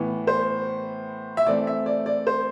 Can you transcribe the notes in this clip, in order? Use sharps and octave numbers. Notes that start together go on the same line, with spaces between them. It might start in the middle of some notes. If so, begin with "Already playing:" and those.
Already playing: A2 E3 B3
C5
E5
E3 A3 C4 D5
E5
D5
D5
C5